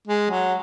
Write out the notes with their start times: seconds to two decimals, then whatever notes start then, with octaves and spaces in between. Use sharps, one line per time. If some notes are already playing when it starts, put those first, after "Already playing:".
0.08 G#3
0.30 F#3